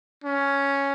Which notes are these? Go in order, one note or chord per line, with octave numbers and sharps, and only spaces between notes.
C#4